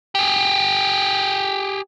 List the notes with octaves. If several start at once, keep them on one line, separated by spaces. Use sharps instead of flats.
G4 G#4